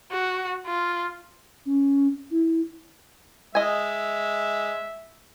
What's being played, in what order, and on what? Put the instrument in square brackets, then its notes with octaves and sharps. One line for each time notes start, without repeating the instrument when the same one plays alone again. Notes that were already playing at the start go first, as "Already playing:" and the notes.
[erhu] F#4
F4
[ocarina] C#4
E4
[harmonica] G#3 [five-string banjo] D#5 G#5 [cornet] E5